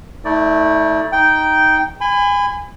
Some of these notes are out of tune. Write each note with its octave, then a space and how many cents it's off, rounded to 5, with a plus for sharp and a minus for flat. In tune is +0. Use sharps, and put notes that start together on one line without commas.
A3 +0 D#4 +45 D5 +0
D#4 +5 G5 -10
G#5 -25 B5 +30